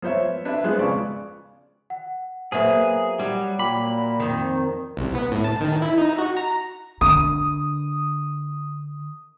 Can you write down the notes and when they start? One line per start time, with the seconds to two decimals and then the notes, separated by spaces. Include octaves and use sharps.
0.02 F3 B3 C5 C#5 E5
0.45 D4 B4 C5 E5
0.64 F3 G#3 B3 F#6
0.79 G#1 C#3 D5 F5 C#6
1.90 F#5
2.52 F#3 A#3 B3 G#4 C5 E5
3.19 F#3 G3
3.59 A#2 G5 B5 D6
4.20 F2 D#3
4.97 C2
5.15 B3
5.32 A2
5.44 A5
5.61 D#3
5.82 E4
5.98 D#4
6.18 F#4
6.37 A#5
7.01 D3 D#6